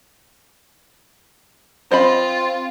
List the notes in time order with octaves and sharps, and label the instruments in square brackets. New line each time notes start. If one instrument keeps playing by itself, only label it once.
[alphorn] C4 [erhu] F4 [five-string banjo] C5 D#5 B5